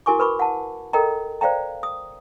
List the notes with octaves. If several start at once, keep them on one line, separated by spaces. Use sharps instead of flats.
E4 F#4 A#4 G#5 C#6 D6
A#4 B4 B5 C#6 D6
F#5 A5
A4 A#4 D#5 G5 A#5
C5 D5 F5 G5 A#5
D#6